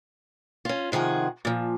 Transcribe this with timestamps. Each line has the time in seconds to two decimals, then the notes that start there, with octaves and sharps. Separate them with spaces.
0.65 C#4 F4
0.92 C3 D#3 F3 G#4 F#5
1.45 A#2 F3